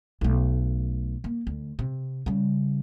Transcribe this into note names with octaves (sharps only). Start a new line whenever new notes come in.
B1 A3
A#3
D2
C3
C#3 G3